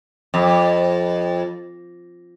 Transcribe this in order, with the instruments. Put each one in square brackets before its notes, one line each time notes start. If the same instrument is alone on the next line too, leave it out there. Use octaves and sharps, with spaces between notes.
[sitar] F2